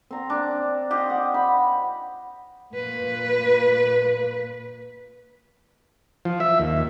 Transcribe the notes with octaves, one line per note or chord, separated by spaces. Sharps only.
C4 A#5
D4
F4 G4 D#5
F#5
B5
A#2 B4
F3
E5
D#2